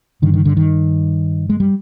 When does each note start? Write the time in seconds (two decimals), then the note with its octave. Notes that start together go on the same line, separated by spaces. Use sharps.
0.22 G2 D3 D#3
0.34 D#3
0.45 D3
0.57 D#3
1.50 G#3
1.60 G3